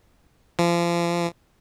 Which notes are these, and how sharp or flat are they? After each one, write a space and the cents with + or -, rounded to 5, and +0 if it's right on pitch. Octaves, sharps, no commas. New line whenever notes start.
F3 -30